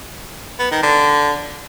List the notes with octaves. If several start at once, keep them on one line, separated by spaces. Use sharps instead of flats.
B3
D#3
D3